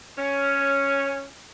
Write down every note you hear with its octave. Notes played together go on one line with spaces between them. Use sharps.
C#4